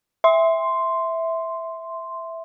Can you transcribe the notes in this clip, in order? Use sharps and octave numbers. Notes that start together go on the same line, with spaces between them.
E5 C6